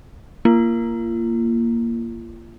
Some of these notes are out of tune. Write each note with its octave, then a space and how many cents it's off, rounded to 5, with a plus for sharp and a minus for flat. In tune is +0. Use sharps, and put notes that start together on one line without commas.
A#3 +0 F4 -35